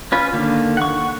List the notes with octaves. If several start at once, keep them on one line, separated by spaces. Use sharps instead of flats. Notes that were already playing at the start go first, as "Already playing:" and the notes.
C#4 F4 B4
D3 D#3 A#3
F#5 C#6